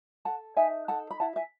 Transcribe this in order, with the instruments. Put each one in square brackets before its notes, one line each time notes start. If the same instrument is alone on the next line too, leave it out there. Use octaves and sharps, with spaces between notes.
[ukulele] A4 F#5 A5
D#4 E5 G#5
A4 F#5 A5
B5
E4 F#5 A5
E5 G#5